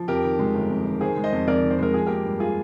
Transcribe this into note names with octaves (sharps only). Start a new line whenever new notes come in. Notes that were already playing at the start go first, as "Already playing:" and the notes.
Already playing: F3
F2 G4 A#4
D#3
G#3
G1
F2
D#3
D#3 G#4 C5
G#3
C5 D#5
F2
F2 A#4 D5
D#3
C5
G#3 A#4
F3 G#4
A#3 G4 A#4
G2
F4 G#4